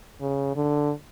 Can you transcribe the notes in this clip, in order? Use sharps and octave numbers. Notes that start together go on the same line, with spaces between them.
C#3
D3